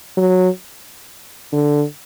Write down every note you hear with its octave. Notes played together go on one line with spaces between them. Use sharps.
F#3
D3